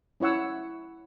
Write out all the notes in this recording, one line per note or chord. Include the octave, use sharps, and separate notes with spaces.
C#4 E4 C#5 F#5 E6